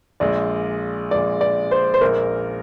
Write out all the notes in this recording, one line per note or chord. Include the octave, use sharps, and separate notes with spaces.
A#1 A#2 G#3 D5
A#1 A#2 G#3 D5
D5
C5
C5
A#1 A#2 G#3 A#4